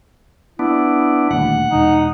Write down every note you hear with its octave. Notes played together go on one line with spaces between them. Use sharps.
B3 D4 E4
D#1 D2 F#5
E1 D#4